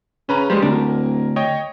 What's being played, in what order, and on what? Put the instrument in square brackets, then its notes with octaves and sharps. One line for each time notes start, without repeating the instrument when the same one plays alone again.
[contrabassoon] C#3 [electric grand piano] C#4 B4 A#5
[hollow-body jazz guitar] G3 G#3 [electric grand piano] C5
[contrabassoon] D1 [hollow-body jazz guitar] D2 D4 [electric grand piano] A#4
[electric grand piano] C#5 D#5 G5